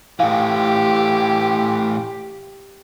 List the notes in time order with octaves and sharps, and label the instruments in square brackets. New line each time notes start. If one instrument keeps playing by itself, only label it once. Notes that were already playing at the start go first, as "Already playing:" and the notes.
[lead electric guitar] A2 E3 [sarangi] G4 [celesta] F5